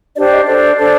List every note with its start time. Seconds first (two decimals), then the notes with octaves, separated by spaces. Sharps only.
0.14 D4 G4 C5 D5
0.30 D#5
0.46 D4 A4 C5
0.78 D4 A4 C5